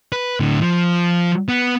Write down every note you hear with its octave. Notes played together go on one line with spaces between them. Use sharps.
B4
A2 D3
F3
B3